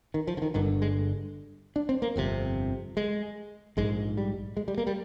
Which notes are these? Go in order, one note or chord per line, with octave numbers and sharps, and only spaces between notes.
D#3
F3
D3
D#3
G1 G2 D3 D#3
G#3
D4
C4
A#3
G1 F2 C3
G#3
A#1 G#2 G#3
G3
G#3
G3
A#3
G3